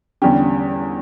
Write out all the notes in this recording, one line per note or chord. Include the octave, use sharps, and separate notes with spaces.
E2 D3 G3 C#4 G4